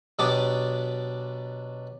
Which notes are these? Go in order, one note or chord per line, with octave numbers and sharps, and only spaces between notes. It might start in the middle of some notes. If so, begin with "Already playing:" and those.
B2 F#3 D4 G4 D6 D#6